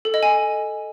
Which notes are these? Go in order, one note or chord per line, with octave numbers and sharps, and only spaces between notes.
A4
D#5
G#5